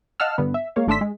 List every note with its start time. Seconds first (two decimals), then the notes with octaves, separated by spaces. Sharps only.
0.20 D#5 F5 F#5 A5 E6 F6
0.38 G2 D3 B3
0.54 E5
0.76 G#3 A#3 C#5 F5
0.87 G#1 A3 D4 C6 E6 B6
1.01 G#3